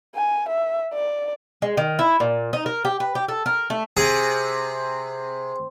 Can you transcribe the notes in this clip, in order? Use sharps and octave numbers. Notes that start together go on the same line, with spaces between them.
G#5
E5
D5
G#3
D#3
E4
A#2
D#4
A#4
G4
B4
G4
A4
A#4
A3
C3 G#4